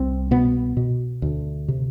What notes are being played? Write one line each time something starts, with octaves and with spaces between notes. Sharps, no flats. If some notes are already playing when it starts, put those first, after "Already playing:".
Already playing: C2 C4
B2 B3
B2
D2
C3